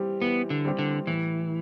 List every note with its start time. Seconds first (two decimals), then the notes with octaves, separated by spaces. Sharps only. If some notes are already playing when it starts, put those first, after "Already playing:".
Already playing: E3 G3 C4 G4
0.22 E3 B3
0.50 D3
0.65 G3 C4 G4
0.79 D3
1.07 A2 E3